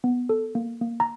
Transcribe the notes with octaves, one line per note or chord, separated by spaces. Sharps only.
B3
A4
A#3
A#3
A#5